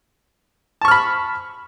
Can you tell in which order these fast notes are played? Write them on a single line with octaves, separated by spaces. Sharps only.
A5 C#6 F6 B5